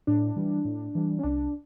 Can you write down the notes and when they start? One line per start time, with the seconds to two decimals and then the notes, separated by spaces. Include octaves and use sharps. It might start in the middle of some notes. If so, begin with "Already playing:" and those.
0.07 A2 D4
0.36 E3 G3
0.65 A2
0.95 E3 G3
1.19 C#4
1.23 C2 D4